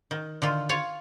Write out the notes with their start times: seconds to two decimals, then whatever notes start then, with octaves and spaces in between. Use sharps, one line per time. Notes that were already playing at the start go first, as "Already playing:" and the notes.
0.11 D#3
0.42 D3 D#3 F4
0.69 F4 C#5 F5